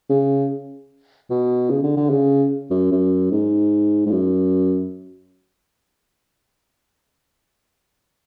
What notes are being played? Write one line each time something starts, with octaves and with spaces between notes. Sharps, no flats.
C#3
B2
C#3
D3
D3
C#3
F#2
F#2
G#2
G#2
F#2